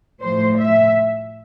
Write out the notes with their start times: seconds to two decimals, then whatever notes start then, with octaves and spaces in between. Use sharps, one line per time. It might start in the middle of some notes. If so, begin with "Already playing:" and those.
0.22 A2 F3 A3 C5
0.59 E5